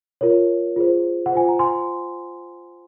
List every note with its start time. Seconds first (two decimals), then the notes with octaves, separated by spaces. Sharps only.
0.21 F4 A#4 C#5
0.76 F4 G#4 C5
1.26 F#5
1.32 F4 C5 G#5
1.48 A#5
1.59 G#5 C6